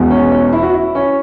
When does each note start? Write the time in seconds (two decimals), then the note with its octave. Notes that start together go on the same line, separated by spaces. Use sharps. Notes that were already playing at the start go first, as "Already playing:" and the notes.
Already playing: E1 E2 B2
0.11 C#4
0.32 C#4
0.52 E4
0.62 F#4
0.73 E4
0.95 C#4